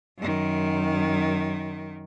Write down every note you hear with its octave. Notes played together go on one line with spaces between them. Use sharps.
F#2 D#3